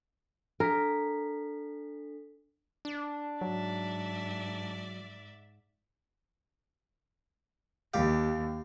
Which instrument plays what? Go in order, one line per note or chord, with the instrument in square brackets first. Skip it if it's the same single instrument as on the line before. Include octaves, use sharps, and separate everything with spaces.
[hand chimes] D4 A4 B6 [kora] A#4
[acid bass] D4
[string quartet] G#2 D5 E5 [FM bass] F#3
[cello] D#2 [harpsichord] G4 F5